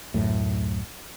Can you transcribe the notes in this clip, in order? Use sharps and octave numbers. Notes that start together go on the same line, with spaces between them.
D1 F#2 A2